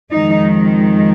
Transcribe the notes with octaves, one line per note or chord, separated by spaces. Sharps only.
F2 D#3 G#3 D#4